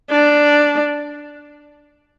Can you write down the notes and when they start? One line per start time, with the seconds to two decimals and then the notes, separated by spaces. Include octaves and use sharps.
0.11 D4